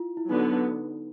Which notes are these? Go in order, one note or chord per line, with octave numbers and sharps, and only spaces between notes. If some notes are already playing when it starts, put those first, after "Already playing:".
Already playing: E4 F4
E4
D3 F#3 B3 D#4